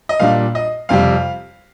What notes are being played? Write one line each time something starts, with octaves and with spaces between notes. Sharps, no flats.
D#5
A#2 G3 D4 F5
D#5
F2 C3 G3 F5